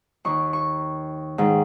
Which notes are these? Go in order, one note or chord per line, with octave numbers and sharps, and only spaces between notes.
D#2 D#3 C#6
C#6
G#2 D#3